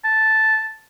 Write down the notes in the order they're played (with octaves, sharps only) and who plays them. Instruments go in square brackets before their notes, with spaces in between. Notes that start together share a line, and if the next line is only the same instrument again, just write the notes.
[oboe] A5